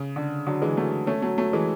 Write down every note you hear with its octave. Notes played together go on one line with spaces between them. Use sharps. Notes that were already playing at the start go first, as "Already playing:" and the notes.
Already playing: C#3
D3
D3 F#3
E3 G#3
F#3 A3
A3 C#4
F#3 A3
F#3 A3
E3 G#3